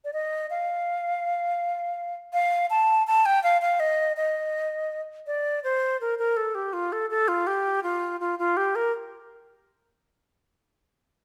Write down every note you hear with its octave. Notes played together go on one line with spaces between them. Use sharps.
D5
D#5
F5
F5
A5
A5
G5
F5
F5
D#5
D#5
D5
C5
A#4
A#4
A4
G4
F4
A4
A4
F4
G4
F4
F4
F4
G4
A#4